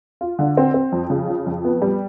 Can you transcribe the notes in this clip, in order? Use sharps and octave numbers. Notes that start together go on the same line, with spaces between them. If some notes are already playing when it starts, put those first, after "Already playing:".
F4
D3
C4
C4
F2
C#3
F3
F2
B3
G3